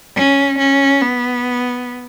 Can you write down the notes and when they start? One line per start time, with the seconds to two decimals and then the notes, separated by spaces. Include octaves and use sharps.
0.16 C#4
0.59 C#4
1.02 B3